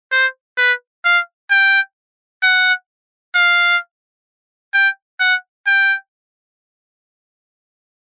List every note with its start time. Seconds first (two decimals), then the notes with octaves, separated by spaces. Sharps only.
0.12 C5
0.57 B4
1.05 F5
1.51 G5
2.43 F#5
3.35 F5
4.74 G5
5.20 F#5
5.67 G5